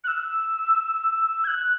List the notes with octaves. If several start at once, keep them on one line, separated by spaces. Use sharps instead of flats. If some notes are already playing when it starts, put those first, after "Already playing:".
F#6
E6
G#6
F#6